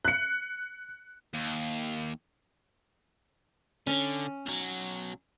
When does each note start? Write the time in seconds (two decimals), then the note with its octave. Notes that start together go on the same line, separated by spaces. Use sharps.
0.05 F#6 C#7
1.34 D#2
3.87 D3 C#4
4.46 B1 F#3